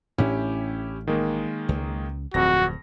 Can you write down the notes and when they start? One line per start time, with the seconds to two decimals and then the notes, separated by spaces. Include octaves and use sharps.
0.18 A1 A2 C#4 D4 E4 G4
1.07 D#3 G#3 A#3
1.69 C#2
2.34 D1 F2 F#4 A#6